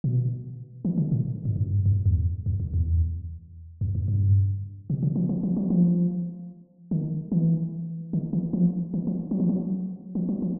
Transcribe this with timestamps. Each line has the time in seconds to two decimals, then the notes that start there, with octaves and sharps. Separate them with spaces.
0.04 B2
0.85 E3
0.98 D3
1.12 A#2
1.45 G#2
1.56 F#2
1.66 G2
1.86 F#2
2.06 E2
2.46 F2
2.60 E2
2.74 E2
3.81 F2
3.95 F#2
4.08 G2
4.90 C3
5.03 C#3
5.16 F3
5.29 F3
5.43 F3
5.57 F#3
5.70 F3
6.91 D#3
7.32 E3
8.13 D#3
8.33 E3
8.53 F3
8.94 E3
9.07 F3
9.31 F#3
9.40 F3
9.49 F#3
10.15 F3
10.29 F#3
10.42 F3